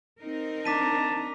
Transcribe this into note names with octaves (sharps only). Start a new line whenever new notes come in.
C4 D#4 A#4
D4 A5 A#5 D6 B6 D#7